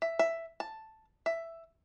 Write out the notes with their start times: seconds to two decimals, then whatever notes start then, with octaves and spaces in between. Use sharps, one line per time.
0.02 E5
0.19 E5
0.60 A5
1.26 E5